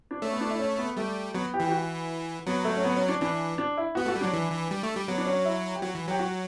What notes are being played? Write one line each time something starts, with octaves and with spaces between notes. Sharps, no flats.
D4
A3 C#4
B3
D4
E4
C#4
B3
G3 A3
F#3 B3
G4
E3
G4
F#4
F#3 B3
A3
C#4
B3
C#4
D4
E3 D4
D4
E4
B3 F#4
A3 F#4
G3
F#3 D4
E3
E3
G3
A3
G3
F#3 B3
D4
C#4
E4
G4
F#3 F#4
E3
F#3 G4
F#4